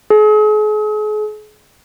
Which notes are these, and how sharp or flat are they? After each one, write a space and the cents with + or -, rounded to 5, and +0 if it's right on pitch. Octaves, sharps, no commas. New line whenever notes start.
G#4 +40